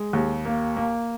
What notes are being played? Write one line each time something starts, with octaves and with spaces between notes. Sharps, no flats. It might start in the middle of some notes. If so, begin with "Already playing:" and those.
Already playing: G#3
D#2
A#3
A#3